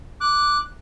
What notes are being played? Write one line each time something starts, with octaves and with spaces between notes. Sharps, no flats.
D6 F#6